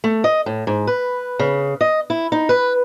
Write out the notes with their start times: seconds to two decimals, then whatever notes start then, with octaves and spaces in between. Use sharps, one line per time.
0.04 A3
0.24 D#5
0.46 A2
0.67 G#2
0.87 B4
1.39 C#3
1.81 D#5
2.10 E4
2.32 D#4
2.49 B4